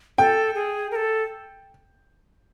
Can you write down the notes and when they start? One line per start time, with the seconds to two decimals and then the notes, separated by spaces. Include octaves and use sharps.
0.18 A4 G5
0.55 G#4
0.91 A#4
0.96 A4